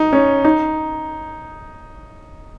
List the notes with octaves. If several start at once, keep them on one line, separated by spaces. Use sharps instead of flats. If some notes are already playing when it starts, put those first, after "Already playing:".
Already playing: D#4
C#4
D#4